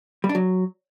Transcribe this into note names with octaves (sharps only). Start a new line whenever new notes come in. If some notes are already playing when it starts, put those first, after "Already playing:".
G3
D4
F#3